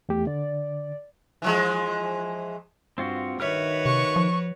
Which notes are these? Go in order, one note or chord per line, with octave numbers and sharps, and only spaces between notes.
E2 A3 G4
D3 D5
E3 F3 G#3
G2 C4 F4 F#4
D#3 F#4 B4 C#5 E5 F6
C3 C#6
F3